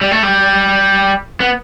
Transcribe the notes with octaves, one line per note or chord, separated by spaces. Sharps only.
G3
A3
G3
B3